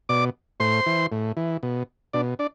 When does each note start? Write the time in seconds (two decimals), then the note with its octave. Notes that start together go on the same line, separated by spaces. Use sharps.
0.09 B2 D5 D6
0.60 A2 C5 C6
0.86 E3
1.12 A2
1.37 E3
1.63 B2
2.13 B2 D4 D5
2.39 D4 D5